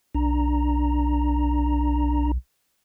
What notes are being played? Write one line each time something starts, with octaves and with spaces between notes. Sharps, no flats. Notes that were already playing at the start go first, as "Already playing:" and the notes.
B1 D4 A#5